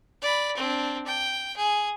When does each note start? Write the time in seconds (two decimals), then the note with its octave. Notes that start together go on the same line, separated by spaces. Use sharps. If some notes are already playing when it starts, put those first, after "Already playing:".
0.22 D5 B5
0.57 C4 D4
1.07 G5
1.57 G#4